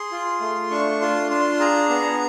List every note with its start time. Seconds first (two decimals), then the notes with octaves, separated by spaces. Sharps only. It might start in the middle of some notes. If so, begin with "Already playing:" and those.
Already playing: G#4 C6
0.12 F4
0.41 A3
0.71 D4 C#6
1.01 F4 C6
1.31 D4 C6
1.60 G#4 A#5
1.90 B3